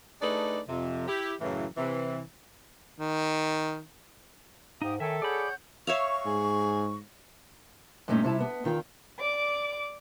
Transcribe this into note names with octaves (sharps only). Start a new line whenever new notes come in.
A3 D4 D#4 G#4 B4 D5
F2 C3
E4 G4
F#2 A2 C#3 E3
C3 E3
D#3
G#2 D#4 G4 F5 D#6
D#3 A4 C#5 E5 G5 G#5
G#4 C#5 D5 F#5 B5 G6
C#5 E5 F5 C#6
G#2 G#4
G2 A#2 A3 C#4 D#4
C3 G3 E4 A5
B3
E2 D#3 F4 G5
D5 D6